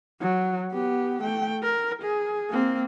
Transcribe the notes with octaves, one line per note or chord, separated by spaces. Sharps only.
F#3
B3 G4
A3 G5
A#4
G#4
A#3 C4